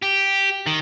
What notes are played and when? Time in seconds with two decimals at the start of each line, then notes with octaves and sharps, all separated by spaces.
0.02 G4
0.66 D#3